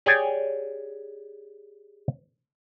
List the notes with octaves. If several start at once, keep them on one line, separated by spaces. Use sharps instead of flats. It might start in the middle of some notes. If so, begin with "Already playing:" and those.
G4 G#4 C#5 D5 G5 G#5